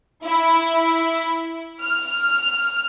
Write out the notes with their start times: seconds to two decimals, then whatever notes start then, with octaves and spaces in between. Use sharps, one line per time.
0.24 E4
1.81 F6